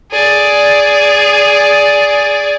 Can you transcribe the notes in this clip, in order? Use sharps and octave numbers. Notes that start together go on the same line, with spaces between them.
G#4 D5